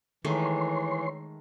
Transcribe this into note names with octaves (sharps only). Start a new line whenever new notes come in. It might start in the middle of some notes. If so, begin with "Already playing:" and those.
D#3 E3 G#3 A3 C#5 C6